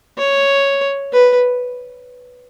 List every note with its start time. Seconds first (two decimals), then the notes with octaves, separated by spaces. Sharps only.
0.18 C#5
1.13 B4